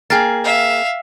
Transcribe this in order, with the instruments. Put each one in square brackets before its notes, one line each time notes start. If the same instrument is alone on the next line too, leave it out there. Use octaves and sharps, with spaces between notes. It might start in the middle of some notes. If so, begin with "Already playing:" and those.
[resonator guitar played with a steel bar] A#3 G#4 [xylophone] G5 F6 A6
[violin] E5 F5